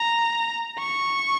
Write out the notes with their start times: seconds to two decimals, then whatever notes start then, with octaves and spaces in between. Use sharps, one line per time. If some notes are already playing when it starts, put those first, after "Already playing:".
Already playing: A#5
0.79 C#6